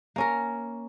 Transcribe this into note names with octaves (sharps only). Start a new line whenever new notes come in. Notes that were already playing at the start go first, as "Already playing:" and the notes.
A#3 C#4 A#4